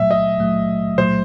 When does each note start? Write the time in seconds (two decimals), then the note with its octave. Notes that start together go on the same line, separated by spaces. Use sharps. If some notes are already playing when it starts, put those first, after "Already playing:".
Already playing: A#2 F#3 A3 E5
0.11 D#5
0.40 A#2 F#3 A3
0.98 A#2 F#3 A3 C5